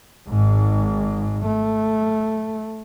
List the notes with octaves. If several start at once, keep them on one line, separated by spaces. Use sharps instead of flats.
G#1 G#2
A3